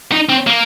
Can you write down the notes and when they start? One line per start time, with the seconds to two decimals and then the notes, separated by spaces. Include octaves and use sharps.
0.12 D#4
0.29 C4
0.47 A#3